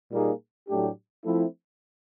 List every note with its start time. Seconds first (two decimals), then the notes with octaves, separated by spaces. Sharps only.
0.11 A#2 G3 A#3 D#4 G#4
0.68 A2 F#3 A3 D4 G4
1.25 F3 A3 C4 E4